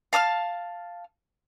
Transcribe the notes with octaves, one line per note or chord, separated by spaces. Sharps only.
F5 A5 D#6 F6